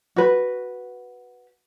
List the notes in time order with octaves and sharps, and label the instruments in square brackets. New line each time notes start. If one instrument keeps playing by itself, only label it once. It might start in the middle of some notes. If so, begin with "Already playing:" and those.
[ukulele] F#4 B4